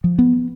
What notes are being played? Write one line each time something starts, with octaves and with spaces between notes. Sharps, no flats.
F3
B3